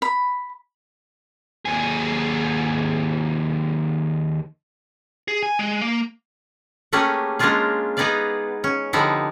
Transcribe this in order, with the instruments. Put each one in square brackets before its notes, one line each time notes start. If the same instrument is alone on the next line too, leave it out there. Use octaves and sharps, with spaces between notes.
[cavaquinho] B5
[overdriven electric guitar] D#2 G#4
G#4
G#5
G#3
A#3
[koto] A3 A#3 C#4 G4 G#4 B4
G#3 A#3 C#4 D4 F4 G#4
B3 D#4 G#4 B4 D5 F5
C#4
D3 F3 G3 B3 D#4 E4